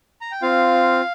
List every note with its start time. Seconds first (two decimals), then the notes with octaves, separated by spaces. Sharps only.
0.21 A#5
0.32 G5
0.42 C4 F4 F5